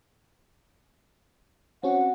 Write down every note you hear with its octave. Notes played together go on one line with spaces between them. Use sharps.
C4 C#4 F#4 F#5